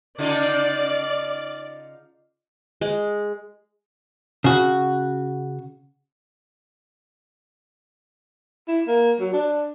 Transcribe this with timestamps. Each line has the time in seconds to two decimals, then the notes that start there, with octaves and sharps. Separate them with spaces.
0.18 C#3 D#4 F4 D5
2.81 G#3
4.44 C#3 F#4
8.68 E4
8.87 A#3
9.20 F#3
9.33 D4